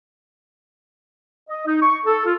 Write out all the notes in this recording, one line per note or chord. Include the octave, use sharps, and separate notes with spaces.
D#5
D#4
C#6
A4
F4